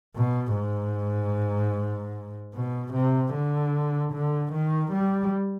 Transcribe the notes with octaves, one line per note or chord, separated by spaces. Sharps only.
B2
G#2
B2
C3
D3
D3
D#3
G3